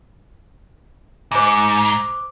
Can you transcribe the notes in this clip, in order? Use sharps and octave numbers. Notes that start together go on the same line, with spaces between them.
G#2 C5 D6